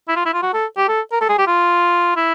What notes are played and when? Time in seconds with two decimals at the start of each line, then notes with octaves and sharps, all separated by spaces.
0.08 E4
0.16 F4
0.25 E4
0.33 F4
0.42 F#4
0.53 A4
0.77 G4
0.88 A4
1.12 A#4
1.21 A4
1.29 G#4
1.38 G4
1.47 F4
2.16 E4